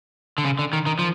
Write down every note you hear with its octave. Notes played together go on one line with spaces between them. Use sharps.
D3
C#3
D3
D#3
D#3
F3